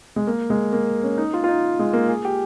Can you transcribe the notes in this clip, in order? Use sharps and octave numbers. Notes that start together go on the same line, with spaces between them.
G#3
A#3
G#3
A#3
C#4
D#4
F4
F4
D#4
G#3
A#3
G#4
G4